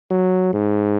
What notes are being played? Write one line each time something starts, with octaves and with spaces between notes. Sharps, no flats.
F#3
G#2